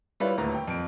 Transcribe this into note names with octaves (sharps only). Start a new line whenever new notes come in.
G3 E4 F4 B4 C#5
D#1 D2 B4 A#5
G5
F2 D7